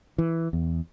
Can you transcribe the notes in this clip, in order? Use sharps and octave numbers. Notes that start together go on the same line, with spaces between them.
E3
E2